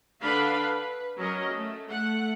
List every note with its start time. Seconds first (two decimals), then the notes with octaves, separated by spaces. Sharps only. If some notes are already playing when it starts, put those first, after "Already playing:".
0.22 D3 D4 A4 B4 F5 B5
0.73 B4
1.18 F#3 C#4 A#4 D#5
1.50 A3
1.89 A3 F#5